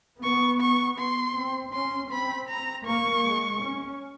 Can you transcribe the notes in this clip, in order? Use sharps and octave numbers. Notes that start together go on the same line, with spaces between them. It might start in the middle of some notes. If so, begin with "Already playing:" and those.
B3 C#6
C#6
C6
C4
C#4 C6
C4 B5
A#5
A#3 C#6
G#3
C#4